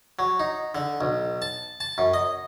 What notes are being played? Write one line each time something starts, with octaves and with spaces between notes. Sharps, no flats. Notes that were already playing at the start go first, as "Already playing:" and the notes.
F#3
D#4
D3
B1
A5
A5
F#2
D#5